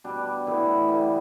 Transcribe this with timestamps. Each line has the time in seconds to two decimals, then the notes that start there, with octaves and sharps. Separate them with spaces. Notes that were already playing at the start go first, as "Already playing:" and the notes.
0.04 B2 G3 D4
0.46 A2 E3 B3 E4
0.88 D3 G3 B3